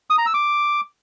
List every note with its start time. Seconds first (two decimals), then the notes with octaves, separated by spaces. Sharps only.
0.10 D#6
0.18 A#5
0.26 E6
0.34 D6